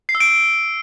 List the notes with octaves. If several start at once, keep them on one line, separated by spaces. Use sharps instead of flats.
C7
E6
D7